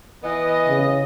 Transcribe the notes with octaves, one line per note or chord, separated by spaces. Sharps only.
E3 B3 D#5
C#3